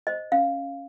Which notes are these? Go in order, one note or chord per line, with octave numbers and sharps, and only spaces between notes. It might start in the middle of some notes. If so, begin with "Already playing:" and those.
C5 D#5
C#4 F5